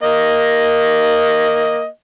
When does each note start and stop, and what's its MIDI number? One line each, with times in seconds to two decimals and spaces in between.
0.03 1.86 58
0.03 1.86 75